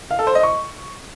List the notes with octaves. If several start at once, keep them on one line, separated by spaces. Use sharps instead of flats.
F5
A4
C5
D#5
C#6